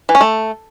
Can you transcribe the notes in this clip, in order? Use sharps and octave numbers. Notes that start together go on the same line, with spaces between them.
E3
C#4
A3